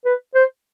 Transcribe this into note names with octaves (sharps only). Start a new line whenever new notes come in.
B4
C5